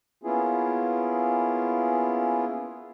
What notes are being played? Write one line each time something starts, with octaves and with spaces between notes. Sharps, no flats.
A#3 B3 C#4 E4 F4 G#4